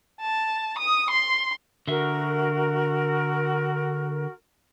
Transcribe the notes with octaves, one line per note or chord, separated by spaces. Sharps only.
A5
D#6
C6
D3 F#4 A#4 E5